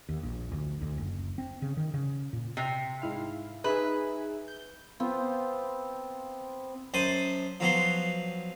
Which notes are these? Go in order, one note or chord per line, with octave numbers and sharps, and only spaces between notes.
D#2
A#1
D2
D2
F#1
C4
C#3
D#3
C#3
A#2
C3
G#2 E4 F5
D#4 G#4 B4 E5
G6
B3 C4 F4 C5
F#2 C5 A5 B5 D#6
F3 F#3 B3 C6